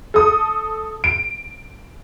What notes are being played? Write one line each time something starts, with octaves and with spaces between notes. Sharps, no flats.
A4 D#6
D7